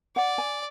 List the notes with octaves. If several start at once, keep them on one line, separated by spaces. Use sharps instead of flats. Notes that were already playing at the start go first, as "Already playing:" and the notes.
D5 F#5
G#5